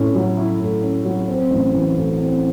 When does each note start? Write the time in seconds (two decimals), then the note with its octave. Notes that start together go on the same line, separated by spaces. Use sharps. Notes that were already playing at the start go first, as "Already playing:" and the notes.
Already playing: A2 C#4 E4
0.15 F#3
0.37 E4
0.60 A2
0.82 C#4
1.05 F#3
1.28 C4
1.50 A1
1.73 E3
1.96 A2
2.18 C4